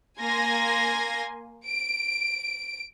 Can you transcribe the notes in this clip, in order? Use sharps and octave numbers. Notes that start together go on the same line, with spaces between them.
A#3 G#5 C6 G#6 A#6
D7